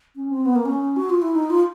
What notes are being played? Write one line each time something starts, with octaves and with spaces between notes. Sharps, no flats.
C#4
C4
B3
A#3
C#4
F#4
F4
E4
D#4
F4